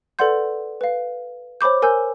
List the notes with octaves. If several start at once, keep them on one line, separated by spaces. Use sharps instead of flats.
A4 B4 D5 F#5 C6 G6
B4 F5
C5 C#5 B5 D6 G6
A#4 G#5 E6 G6